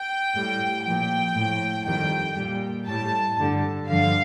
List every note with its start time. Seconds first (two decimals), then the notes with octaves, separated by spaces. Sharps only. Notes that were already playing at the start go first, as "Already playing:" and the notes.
Already playing: G5
0.34 A2 G3
0.84 A#2 F3 G5
1.35 A2 F3
1.85 F2 D#3 G3 G5
2.36 A#2 G3
2.87 A2 G3 A5
3.37 G2 D3 G3
3.88 G2 D3 F3 F5